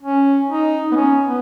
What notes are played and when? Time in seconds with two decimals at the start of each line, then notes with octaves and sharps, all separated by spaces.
0.03 C#4
0.49 D#4
0.92 B3
0.96 C#4
1.26 B3